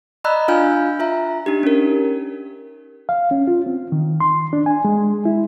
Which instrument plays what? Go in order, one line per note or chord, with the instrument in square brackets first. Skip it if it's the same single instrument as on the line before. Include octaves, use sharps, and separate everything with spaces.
[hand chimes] D5 D#5 A#5 B5 E6 F#6
D4 F4 F5 G#5 F6 G6
F4 E5 A#5
D4 D#4 G4
C#4 A#4
[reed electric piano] F5
C#4
F4
C4
D#3
C6
D4
G#5
G#3
E4